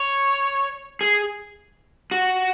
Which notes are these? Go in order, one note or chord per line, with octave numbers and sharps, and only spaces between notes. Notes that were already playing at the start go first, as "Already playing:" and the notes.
Already playing: C#5
G#4
F#4